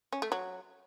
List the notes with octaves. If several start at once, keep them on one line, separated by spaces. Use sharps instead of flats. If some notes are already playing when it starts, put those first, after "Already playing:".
C#4
A3
F#3